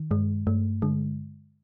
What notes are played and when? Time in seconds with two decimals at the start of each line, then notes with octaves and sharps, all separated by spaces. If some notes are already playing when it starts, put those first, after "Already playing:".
Already playing: D#3
0.11 G2 G#3
0.47 G2 A3
0.82 D3 G#3